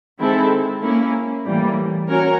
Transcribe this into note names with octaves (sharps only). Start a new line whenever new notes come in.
D#3 G#3 C4 E4 A4
A#3 C#4 E4
A2 E3 G3 A#3
C#4 F#4 A#4 C#5